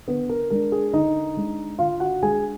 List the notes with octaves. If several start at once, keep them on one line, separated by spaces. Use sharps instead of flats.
D3 B3 B4
A#4
G#3 D4 A#4
G#4
D3 D#4 D#5
G#3 D4
D3 F4 F5
F#4 F#5
G#3 D4 G#4 G#5